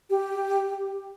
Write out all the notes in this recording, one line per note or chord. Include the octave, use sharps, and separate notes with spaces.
G4